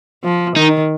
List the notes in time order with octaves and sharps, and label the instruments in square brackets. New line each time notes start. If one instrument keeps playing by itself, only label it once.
[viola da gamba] F3
[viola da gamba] D#3 [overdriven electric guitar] D#4